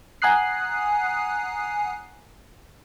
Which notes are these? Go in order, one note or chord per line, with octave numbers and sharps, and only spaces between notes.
F#5 G#5 A#5 D#6 F#6 C7